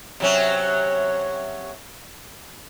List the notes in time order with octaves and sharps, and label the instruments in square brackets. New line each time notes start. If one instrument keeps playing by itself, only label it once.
[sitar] C3 F#3 C#4